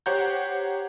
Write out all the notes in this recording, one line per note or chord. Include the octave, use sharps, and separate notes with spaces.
G4 C5 C#5 F#5 A#5 G6